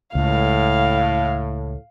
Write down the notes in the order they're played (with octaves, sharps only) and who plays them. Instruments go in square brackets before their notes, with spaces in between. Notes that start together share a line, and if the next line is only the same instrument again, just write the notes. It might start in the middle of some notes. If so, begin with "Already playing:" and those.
[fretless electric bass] C#2 [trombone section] A2 [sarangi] F5